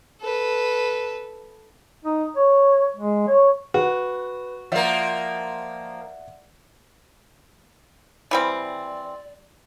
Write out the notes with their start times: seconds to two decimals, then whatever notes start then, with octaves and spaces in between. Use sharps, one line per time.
0.21 A4 B4
2.05 D#4
2.36 C#5
2.97 G#3
3.27 C#5
3.74 F#4 B4
4.72 F3 A#3 D5 E5 F#5
8.31 E3 G3 C4 D5